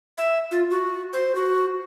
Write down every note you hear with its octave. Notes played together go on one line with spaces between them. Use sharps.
E5
F4
F#4
C5
F#4